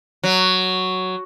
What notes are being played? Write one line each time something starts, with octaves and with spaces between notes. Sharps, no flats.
F#3